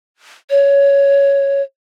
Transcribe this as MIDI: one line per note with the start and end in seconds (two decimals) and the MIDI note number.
0.50 1.62 73